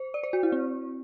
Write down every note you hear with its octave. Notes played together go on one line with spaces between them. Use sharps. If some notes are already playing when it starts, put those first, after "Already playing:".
Already playing: C5
D5
C5
F#4
E4
C4